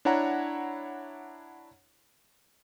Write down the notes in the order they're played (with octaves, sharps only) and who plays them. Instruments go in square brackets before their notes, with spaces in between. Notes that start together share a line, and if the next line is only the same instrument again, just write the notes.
[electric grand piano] D4 E4 C#5 F#5 A#5